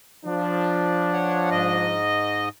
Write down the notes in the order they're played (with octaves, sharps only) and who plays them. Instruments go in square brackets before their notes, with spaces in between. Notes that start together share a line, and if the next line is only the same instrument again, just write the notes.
[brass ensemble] F3 D4
[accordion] C#5 F#5
G#2 D#5